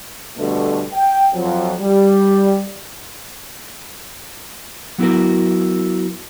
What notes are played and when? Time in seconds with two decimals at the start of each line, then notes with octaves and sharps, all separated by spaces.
0.37 B2 D3 G3 A3
0.94 G5
1.33 F2 F3 F#3
1.81 G3
4.98 F#3 B3 E4 F#4 A#4